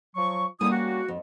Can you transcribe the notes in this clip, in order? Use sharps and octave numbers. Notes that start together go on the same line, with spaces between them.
F3 F#3 C#6
D3 G3 A#3 C#4 E4 D#6
F#4
F2